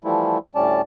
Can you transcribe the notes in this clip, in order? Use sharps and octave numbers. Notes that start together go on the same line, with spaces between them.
E3 F3 G3 A3 E4
D2 A2 G3 C#4 D5 A5